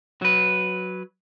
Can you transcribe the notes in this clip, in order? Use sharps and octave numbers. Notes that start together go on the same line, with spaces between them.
F#3 B4